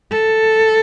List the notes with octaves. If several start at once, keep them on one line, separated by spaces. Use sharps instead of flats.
A4